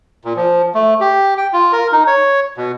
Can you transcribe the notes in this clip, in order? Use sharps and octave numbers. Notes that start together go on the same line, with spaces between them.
A#2
F3
A3
G4
G5
F4
A#4
D#4
C#5
B2